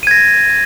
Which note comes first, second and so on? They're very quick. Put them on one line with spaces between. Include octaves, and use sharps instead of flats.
D#7 G#6 A#6